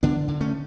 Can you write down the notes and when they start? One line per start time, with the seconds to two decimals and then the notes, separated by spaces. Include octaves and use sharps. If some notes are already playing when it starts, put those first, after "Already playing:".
0.03 D3 B3 D4
0.28 D3
0.40 A3 C#4